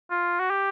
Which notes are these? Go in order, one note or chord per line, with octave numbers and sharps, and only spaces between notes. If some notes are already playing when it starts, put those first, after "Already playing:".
F4
F#4
G4